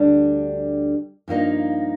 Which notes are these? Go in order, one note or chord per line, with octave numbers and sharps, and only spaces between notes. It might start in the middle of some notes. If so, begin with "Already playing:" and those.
Already playing: D2 D3 G3 D4
G2 F3 A#3 D#4